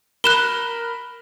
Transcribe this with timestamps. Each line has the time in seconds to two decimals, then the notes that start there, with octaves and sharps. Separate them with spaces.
0.24 A#4 B5 F#6 E7 G7